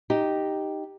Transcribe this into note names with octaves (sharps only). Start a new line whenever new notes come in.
D#4 G4